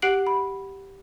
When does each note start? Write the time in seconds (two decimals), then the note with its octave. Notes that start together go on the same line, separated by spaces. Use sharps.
0.02 G4 F#5 F#6 C7 D7 F#7
0.27 B5